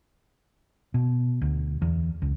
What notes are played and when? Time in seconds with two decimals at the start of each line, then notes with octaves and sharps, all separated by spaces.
0.94 B2
1.42 D2
1.82 E2
2.22 C#2